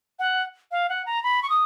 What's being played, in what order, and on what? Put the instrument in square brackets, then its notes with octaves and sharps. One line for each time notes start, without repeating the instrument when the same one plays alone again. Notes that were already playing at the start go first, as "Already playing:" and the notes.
[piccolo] F#5
F5
F#5
A#5
B5
C#6
D#6